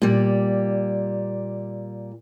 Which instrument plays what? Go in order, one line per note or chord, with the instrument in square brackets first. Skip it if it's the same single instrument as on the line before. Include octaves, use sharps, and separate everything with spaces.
[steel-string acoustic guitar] A#2 G3